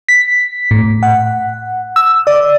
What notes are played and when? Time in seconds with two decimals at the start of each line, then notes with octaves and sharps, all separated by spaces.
0.09 B6
0.71 A2
1.03 F#5
1.96 E6
2.27 D5